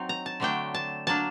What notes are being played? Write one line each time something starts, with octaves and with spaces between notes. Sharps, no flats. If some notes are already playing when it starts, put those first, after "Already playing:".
Already playing: F#3 C4 D#4
A#5
A5
D3 F#3 A3 D4 G5
A5
F#3 A#3 D4 A5